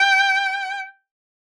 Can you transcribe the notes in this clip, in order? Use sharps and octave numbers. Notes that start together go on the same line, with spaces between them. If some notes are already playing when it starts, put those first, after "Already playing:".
Already playing: G5